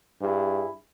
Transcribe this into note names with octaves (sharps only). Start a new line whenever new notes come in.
G2 E4 G#4